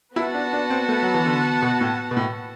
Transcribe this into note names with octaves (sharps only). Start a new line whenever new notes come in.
B3 E4 F#4 B4 F#5 A5
D4
D4
C4
A3
F#3
E3
D3
B2
A2
B2
A2